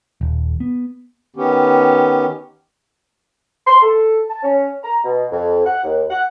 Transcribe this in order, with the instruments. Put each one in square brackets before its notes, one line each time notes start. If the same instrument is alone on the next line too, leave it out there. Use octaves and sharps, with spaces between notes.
[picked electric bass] D#1
B3
[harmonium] D#3 B3 C#4 G4
[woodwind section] C6
A4
A5
C#4
A#5
B2
F2
F#5
D#2
F#5